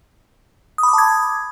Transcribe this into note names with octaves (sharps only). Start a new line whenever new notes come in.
A5 B5 D6 D#6 G#6